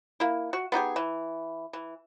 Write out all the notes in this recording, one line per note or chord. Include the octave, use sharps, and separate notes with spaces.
A#3 E4
F#4
B3 D#4 G4 G#4
E3
E3